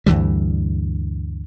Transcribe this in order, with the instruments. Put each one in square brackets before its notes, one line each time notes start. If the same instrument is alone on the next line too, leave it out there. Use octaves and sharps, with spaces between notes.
[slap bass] D2 G2 E3 G3